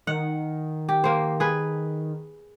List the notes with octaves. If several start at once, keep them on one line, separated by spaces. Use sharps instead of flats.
D#3 F#5
G4
A#3 C5
G#4 B4